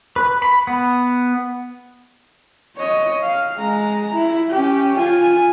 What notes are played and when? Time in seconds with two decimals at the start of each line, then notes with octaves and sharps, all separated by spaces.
0.16 B4
0.42 B5
0.67 B3
2.76 C#5 D#5
3.22 F5
3.56 G#3 A#5
4.13 E4
4.50 C#4 G4
4.97 F4 G#5